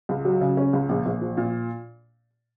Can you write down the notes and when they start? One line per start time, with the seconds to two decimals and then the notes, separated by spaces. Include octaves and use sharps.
0.09 C#2
0.25 F#3
0.41 C#3
0.57 C#4
0.73 C#2
0.89 A#1
1.05 A#1
1.21 F3
1.37 A#2